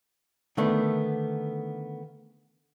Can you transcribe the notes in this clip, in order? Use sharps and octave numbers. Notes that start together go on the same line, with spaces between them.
D3 D#3 A3 B3